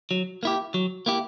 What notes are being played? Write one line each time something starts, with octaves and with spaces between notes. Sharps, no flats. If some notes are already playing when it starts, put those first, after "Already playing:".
F#3
A#3 E4 G4
F#3
A#3 E4 G4